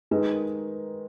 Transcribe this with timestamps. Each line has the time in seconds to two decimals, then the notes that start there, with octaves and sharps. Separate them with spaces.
0.11 D#3 G#3 D#4 B4
0.32 A#4